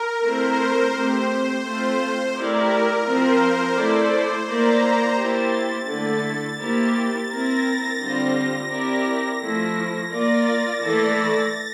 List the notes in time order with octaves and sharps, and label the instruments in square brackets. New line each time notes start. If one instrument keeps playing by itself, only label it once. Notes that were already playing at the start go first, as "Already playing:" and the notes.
Already playing: [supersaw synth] A#4
[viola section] A3 C4 E4 [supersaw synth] C5
[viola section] A3 C4 G4
[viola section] A3 C4 F4 [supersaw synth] C5
[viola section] A3 E4 G4 D5 [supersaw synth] A#4
[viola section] F3 C4 F4 [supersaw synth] C5
[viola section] A3 E4 A4 D5
[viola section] A#3 E4 A#4 D5 [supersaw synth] A#5
[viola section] A#3 E4 G4 C5 [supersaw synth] A6
[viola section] D3 A3 E4 A4 [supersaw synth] A6
[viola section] A#3 E4 G4 C5
[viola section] C4 E4 A#4 [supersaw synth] A#6
[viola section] D3 G3 C4 F4 C5
[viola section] C4 E4 G4 A#4 D5 [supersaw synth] A#6
[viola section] F3 A3 E4
[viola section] A#3 F4 A#4 D5 [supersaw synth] A6
[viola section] E3 A3 E4 A4 D5